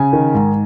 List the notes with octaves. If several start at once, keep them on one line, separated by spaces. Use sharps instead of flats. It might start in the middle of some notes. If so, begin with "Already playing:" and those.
Already playing: C#3 G#5
D#3
G#2